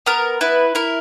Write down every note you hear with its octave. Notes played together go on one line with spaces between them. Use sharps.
B3 A#4
E4 B4
E4 A#4